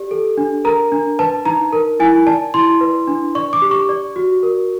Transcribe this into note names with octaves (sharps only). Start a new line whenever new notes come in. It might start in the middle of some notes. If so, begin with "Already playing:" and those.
Already playing: G4 D5
A4
D4
A#4 A#5
D4
B4 A5
D#4 A#5
A#4
E4 G#5
D5 A5
E4 C6
B4
D4
D5 C#6
D6
G4
C#6
D5
F#4
A#4